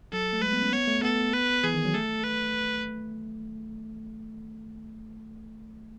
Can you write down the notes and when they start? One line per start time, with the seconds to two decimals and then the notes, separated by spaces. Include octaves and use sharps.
0.13 F#3 A4
0.33 A3
0.42 G#3 B4
0.53 B3
0.62 C#4
0.72 B3 C#5
0.88 A3
1.03 B3 A4
1.34 B4
1.64 E3 G#4
1.74 D#3
1.85 F#3
1.94 A3 A4
2.24 B4